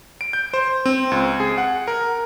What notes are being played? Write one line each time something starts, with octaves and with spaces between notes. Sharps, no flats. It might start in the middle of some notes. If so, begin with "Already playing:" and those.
D7
G6
C5
C4
C#2
G#4
F#5
A#4